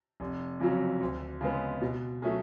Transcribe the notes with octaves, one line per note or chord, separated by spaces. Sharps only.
F1
F2 C#3 F#3
D2
C#3 G#3 B3
B2
F#3 A3 C#4 G#4